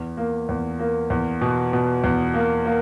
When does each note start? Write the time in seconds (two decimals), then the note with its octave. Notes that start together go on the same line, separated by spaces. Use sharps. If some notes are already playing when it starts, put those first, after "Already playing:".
Already playing: E2
0.17 A#3
0.49 E2
0.79 A#3
1.10 E2
1.41 B2
1.73 B2
2.04 E2
2.34 A#3
2.65 A#3